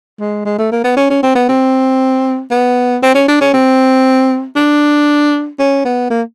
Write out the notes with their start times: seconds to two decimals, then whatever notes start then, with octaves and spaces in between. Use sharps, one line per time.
0.20 G#3
0.45 G#3
0.59 A3
0.72 A#3
0.84 B3
0.97 C#4
1.10 C#4
1.23 C4
1.35 B3
1.49 C4
2.51 B3
3.02 C4
3.15 C#4
3.28 D4
3.41 C#4
3.54 C4
4.56 D4
5.59 C#4
5.85 B3
6.10 A#3